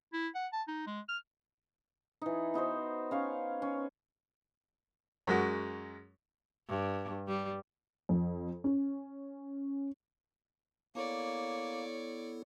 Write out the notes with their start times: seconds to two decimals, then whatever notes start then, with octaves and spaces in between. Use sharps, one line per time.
0.13 E4
0.35 F#5
0.53 A5
0.68 D#4
0.87 G#3
1.09 F6
2.22 E3 D#4
2.54 B3 D#4 F#4 C5
3.11 C#4 F5 C#6
3.62 C#4
5.27 F#2 G#3 F#4
6.69 G2
7.28 G3
8.09 F2
8.64 C#4
10.95 A#3 B3 E4 A4 C#5 D5